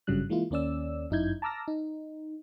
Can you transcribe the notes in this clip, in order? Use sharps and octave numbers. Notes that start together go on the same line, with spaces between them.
G#1 G2 C#3 F#3 G3 F#6
E3 G#3 A#3 E4 F4
D#2 A#3 C#4 D5 E6
G1 F#2 D#4 E4 G6 G#6
A5 A#5 D6 E6 F6 A#6
D#4